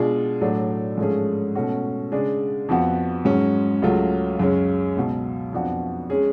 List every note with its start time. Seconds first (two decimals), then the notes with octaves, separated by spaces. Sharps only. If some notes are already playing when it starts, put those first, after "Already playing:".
Already playing: B2 G#3 D4 F4 G#4
0.41 A2 F#3 A3 D4
0.98 G#2 F3 A3 C#4 G#4
1.55 B2 A3 C#4 F#4
2.12 C#3 G#3 D4 G#4
2.68 F2 F3 B3 F#4
3.25 G#2 F#3 C#4
3.82 C#2 C#3 F#3 A3 F4
4.39 F#2 C#3 G#3 C#4
4.96 C#2 B2 F#3
5.53 F2 F3 B3 D4 F#4
6.10 G#3 C#4 G#4